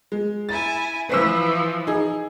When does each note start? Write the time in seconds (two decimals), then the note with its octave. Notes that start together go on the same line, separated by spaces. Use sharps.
0.12 G#3
0.49 E4 G#5 A6
1.09 E3 F3 B4 C5 E6
1.87 D#4 G#4